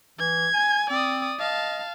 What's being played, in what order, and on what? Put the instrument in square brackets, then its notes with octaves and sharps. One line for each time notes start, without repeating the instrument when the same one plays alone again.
[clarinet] E3 [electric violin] G#6
[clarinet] G#5
[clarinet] C4 [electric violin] D5 D#6
[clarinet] D#5 [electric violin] F5 A5